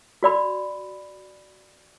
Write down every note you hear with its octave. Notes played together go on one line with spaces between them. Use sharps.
F#4 D5 B5